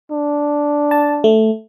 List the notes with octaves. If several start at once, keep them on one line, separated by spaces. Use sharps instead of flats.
D4
A5
A3